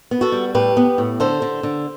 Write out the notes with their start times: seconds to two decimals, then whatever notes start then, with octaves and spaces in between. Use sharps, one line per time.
0.11 B3
0.21 F#4 A4
0.32 G3
0.55 A2 G4 B4
0.77 B3
0.98 A2
1.20 D3 A4 C5
1.42 D3
1.63 D3